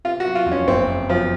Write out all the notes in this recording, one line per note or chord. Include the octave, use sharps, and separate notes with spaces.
C3 F4
F#4
F#3
F4
F2
C#4
F#1 C4
C3
F3 F#3